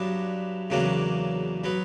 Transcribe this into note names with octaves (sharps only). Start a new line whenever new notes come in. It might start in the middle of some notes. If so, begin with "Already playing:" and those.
Already playing: G2 F#3 B3 D4
E2 C#3 F#3 A#3 D4
F#3 B3